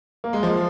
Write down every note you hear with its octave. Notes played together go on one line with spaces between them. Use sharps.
A#3
G#3
F3